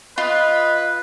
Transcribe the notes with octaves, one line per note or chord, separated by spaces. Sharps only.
F4 B4 D#5